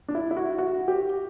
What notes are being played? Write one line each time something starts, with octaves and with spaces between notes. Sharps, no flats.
D4
E4
E4
F#4
F#4
G4